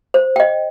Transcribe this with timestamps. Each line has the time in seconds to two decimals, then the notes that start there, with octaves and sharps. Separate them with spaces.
0.14 C5
0.36 D#5 G5